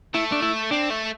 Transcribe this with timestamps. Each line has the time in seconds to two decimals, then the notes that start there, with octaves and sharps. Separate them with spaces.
0.14 A3 E4
0.32 D4
0.42 E4
0.71 C4 D4
0.90 A3